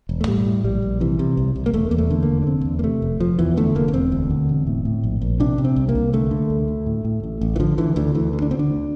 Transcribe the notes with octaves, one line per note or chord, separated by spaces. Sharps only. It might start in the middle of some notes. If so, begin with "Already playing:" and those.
E1
A3
A2 G3
A2
A#1 G3
A#1
C3 E3
C3
C2
C2
A#3
E1 A3
E2 A#3
A3
D3
A#3
E1
D4
F1 C4
E2
A#3
C3 A3
F1
F1 F3
E2 E3
D3 A3
F1 A#3
A#3
E1 C4
D2
D3
E1
A2
A2
A#1
A#1
C3 D4
C3
C4
C2
A#3
C2
D3 A3
D3
D2
D2
A2
A2
A1
A1
E3
D3 F3
D3 E3
D2 D3
D2 E3
D3
D4
D3 C4
D4
D2